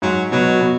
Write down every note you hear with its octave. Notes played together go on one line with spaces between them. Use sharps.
G#2 F#3
B2 F#3
B2